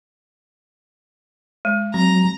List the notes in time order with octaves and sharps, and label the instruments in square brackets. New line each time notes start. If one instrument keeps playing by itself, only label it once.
[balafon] G#3
[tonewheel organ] F#3 [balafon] C4 [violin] A#5